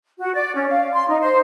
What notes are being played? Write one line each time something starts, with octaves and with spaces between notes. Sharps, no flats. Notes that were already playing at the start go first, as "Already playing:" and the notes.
F#4
D5
C#4
F5
C6
D#4
C5